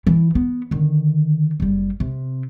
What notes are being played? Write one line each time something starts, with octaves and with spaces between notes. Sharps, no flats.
E3 E4
B3
D3 D#3
F#1 G3
C3